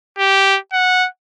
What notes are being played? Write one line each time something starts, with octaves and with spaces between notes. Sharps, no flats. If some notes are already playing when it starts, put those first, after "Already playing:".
G4
F#5